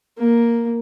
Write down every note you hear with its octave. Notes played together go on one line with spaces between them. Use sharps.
A#3